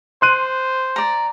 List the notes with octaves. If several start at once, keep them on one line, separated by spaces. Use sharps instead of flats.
C5 C6 F#6 D#7
D5 A#5